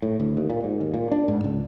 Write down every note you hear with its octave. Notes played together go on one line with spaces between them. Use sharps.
A2
D2
D#2
A#2
G#2
D#2
A#2
D4
G#2
C#2